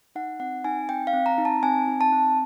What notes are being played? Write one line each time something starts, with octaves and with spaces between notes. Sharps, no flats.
D#4 F#5
C4 F#5
D#4 G#5
C4 G5
F5
C4
A#5
D#4
A5
C4 G#5
D#4
A5
C4